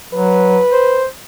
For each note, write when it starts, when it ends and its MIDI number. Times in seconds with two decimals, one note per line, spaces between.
0.13 0.60 54
0.13 1.02 71
0.72 1.05 72